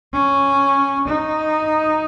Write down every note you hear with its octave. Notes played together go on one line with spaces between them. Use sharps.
C#4
D#4